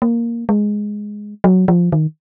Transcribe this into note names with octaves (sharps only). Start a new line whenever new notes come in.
A#3
G#3
F#3
F3
D#3